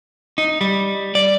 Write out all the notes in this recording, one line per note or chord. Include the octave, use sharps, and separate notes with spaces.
D#4
G3
D5